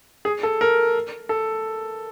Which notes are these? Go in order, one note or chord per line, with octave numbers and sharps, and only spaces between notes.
G#4
A4
A#4
A4